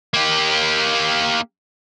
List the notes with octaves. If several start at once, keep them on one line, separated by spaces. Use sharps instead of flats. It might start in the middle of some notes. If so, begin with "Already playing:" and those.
A#3 G4